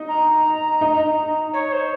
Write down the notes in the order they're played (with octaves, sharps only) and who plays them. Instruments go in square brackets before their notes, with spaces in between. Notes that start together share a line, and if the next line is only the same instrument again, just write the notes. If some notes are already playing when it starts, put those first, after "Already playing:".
Already playing: [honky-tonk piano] D#4
[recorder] A#5
[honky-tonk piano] D#4
[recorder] C#5
C5